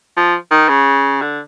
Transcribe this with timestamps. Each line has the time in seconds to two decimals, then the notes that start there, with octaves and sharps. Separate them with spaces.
0.17 F3
0.51 D#3
0.69 C#3
1.21 D3